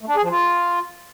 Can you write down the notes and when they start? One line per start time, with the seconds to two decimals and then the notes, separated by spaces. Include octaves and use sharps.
0.01 A3
0.08 D4
0.15 G#4
0.23 F3
0.30 F4